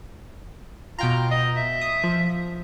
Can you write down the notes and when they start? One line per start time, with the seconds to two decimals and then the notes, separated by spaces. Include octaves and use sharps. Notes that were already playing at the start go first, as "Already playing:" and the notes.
0.99 B2 F4 G5 A#5
1.31 D#5
1.57 E5
1.81 D#6
2.03 F3